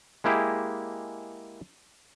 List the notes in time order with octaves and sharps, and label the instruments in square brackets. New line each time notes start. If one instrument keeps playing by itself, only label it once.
[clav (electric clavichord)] G#3 A#3 E4 G4 G#4